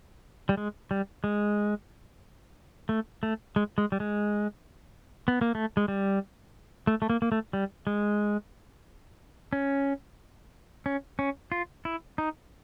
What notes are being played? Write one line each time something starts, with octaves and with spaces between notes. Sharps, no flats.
G3
G#3
G3
G#3
A3
A3
G#3
G#3
G3
G#3
B3
A#3
A3
G#3
G3
A3
A3
A#3
A#3
A3
G3
G#3
C#4
C#4
C#4
F4
E4
D#4